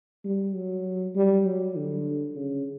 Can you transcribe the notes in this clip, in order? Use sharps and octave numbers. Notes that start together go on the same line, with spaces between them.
G3
F#3
G3
F#3
D3
C#3